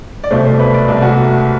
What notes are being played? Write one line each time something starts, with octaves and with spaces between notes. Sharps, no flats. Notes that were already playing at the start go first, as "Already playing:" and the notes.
D5
C2 B2 A3 C5
C5
B4
D5
C2 B2 A3 D5
F#4